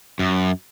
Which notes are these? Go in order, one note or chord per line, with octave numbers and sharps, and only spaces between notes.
F#2